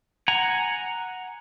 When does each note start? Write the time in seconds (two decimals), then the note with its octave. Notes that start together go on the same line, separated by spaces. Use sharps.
0.28 F#5 G#5 A#5